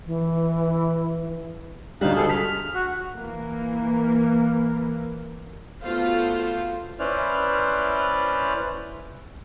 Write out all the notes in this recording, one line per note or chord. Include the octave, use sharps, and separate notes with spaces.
E3
D2 G3 D#4 F5 F#6
G#4 A4
F6 B6
F#4
E3 A#3
A3 B3 F4 F#4 C5 F5
C#4 E4 B4 C5 D5 F6